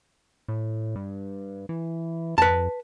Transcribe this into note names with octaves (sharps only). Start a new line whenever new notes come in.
A2
G2
E3
F2 B4 A5